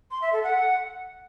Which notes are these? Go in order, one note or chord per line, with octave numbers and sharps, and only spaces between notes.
C6
E5
A4
F#5